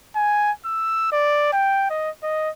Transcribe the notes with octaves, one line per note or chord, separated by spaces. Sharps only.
G#5
E6
D5
G5
D#5
D#5